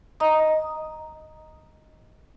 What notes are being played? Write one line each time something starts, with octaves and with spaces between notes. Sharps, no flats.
D#5 A#5 D#6